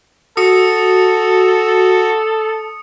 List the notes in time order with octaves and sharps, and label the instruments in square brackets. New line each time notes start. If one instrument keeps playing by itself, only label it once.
[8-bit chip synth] F#4 [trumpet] A4 [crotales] D#6 C#7